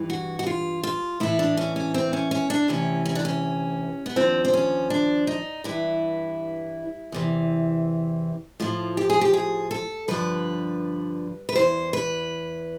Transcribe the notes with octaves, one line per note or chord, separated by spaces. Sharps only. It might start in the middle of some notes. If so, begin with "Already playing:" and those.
Already playing: G2 E3
F#4
F#4
F4
F4
A2 E3 E4
D4
C#4
C#4
C4
C#4
C#4
D4
D2 C3 E3 C#4
C#4
D4
C#4
B3
D#2 D3 F3 C4
C4
C#4
D4
D#4
G2 E3 E4
E2 C3 E3
A2 F3 F4
G4
G#4
G4
G#4
A4
G2 D3 F3 B4
B4
E2 C3 E3 C5
B4